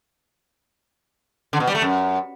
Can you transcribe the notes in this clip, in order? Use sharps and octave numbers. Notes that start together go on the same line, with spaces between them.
D3
B2
G3
A3
F#2